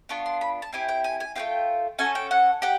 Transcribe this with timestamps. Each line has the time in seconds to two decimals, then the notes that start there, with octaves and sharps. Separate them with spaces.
0.09 B3 D4 F4 C#6
0.26 C6
0.41 B5
0.62 A5
0.73 C4 E4 G4 G#5
0.89 G5
1.04 G#5
1.20 G#5
1.35 A3 C4 F4 G5
1.99 C#4 F#4 A4 G#5
2.15 G5
2.31 F#5
2.62 G4 F#5